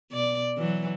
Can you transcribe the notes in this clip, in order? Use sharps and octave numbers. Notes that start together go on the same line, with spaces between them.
B2 D5
E3 F#3